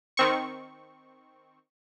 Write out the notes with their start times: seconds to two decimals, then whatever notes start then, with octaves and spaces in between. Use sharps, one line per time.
0.17 D#3 C4 C#6